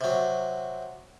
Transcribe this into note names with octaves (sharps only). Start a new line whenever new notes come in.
C3 F#3